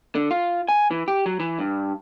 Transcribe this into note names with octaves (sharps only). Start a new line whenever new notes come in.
D3
F4
G#5
E3
G4
F#3
E3
G2